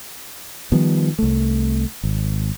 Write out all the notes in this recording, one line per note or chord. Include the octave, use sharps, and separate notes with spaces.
D#3 F3 G3 B3
C2 A3
G#1